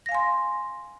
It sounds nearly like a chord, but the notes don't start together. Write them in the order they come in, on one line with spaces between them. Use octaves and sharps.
A#6 F5 G#5 C6